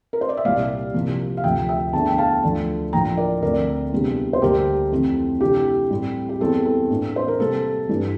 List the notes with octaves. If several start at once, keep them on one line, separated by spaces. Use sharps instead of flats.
A#4
C5
D5
E5
C2 A#2 G3 A#3 D5 F5
C2 C3 F3 A#3
F5
D2 C3 F3 E5 G5
E5 G5
E2 D3 A3 D4 A5
G5
F5 A5
D2 D3 F3 A3 D4
A2 F3 A#3 D4 G5 A#5
A#4 D5
D2 D3 A3 C4 A#4 D5
E2 C3 G3 A#3 D4
C5
D2 D3 G3 A#3 G4 A#4
F2 E3 A3 C4
C3 E3 A3 D4 G4
A2 G3 C4
G4
E2 E3 G3 C4 A4
A4
A2 E3 A#3 D4
C5
A#4
C3 G3 A#3 A4
G2 E3 A3 D4